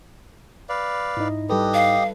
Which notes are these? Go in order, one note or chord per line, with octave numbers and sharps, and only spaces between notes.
B4 D5 F5
G#2 D#4 E4 D#5
G3 G4 A4 B4 D#5
F5